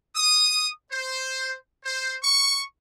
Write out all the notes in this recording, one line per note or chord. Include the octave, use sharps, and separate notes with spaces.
D#6
C5
C5
C#6